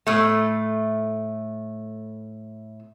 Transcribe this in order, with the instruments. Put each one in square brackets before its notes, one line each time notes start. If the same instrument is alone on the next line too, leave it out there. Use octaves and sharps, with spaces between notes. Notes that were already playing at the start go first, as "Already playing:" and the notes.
[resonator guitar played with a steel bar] A2 A3